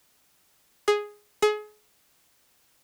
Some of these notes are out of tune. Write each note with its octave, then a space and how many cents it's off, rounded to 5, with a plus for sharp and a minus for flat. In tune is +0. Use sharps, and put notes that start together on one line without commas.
G#4 +0
G#4 +30